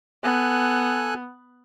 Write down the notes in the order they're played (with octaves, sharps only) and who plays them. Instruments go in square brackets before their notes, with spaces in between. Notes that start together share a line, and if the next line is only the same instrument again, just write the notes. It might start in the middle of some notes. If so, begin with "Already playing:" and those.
[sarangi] B3 [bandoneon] A4 G#5 F#6